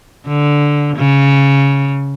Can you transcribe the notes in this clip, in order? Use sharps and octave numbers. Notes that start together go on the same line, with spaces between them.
D3
C#3